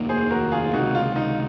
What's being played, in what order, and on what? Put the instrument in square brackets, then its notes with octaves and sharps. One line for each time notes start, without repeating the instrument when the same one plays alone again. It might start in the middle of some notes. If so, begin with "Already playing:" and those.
Already playing: [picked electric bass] F1 D#2 D#3 A#3
[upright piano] G#4 C5
F#4 A#4
F4 G#4
F4
[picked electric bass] C#2 C3 D#3 [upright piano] D#4 F#4
[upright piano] F4
D#4